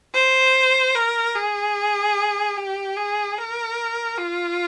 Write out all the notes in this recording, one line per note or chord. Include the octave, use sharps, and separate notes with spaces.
C5
A#4
G#4
G4
G#4
A#4
F4